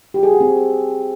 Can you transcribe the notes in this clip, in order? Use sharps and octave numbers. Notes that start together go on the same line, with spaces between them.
G4
G#4
F#4
C4